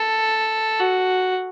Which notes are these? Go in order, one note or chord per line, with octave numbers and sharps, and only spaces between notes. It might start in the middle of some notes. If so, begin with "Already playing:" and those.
Already playing: A4
F#4